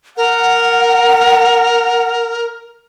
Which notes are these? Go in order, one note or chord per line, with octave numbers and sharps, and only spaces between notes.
A#4 F#5